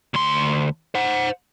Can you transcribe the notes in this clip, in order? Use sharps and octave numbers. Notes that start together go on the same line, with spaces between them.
D2 C6
C5 F#5